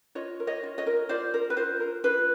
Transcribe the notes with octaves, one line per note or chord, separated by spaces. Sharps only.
F4 C#5 D#5
A#4
C#5 D#5
F4
C#5 D#5
A#4
F4 C5 D5
A#4
B4
F4 C5
A#4
F4 B4